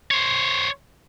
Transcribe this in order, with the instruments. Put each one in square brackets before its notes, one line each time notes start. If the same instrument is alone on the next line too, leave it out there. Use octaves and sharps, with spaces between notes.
[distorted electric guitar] C5 C#5